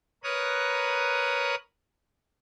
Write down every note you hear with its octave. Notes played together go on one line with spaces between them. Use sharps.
A#4 B4 C#5 D#6 F#6